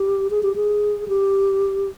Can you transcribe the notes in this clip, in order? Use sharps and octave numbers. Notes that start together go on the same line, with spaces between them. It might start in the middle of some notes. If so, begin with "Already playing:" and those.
Already playing: G4
G#4
G4
G#4
G4